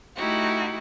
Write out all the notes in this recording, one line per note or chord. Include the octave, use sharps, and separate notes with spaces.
A3 D#4 E4 F#4 G4